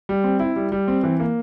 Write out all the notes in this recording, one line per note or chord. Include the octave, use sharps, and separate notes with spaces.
G3
C4
E4
G3
G3
C4
E3
A#3